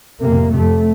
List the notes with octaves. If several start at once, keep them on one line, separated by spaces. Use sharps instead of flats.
F2 C3 A#3
F2 C3 A3